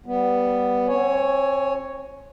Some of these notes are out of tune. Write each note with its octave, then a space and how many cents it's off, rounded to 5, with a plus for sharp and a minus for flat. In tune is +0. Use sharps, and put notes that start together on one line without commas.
G3 -5 B3 +0
C4 +35 C#5 +0 G#5 +10